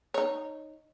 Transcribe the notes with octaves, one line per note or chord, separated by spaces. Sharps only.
D#4 C#5